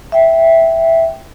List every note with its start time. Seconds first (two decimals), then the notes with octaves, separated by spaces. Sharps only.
0.12 E5 G5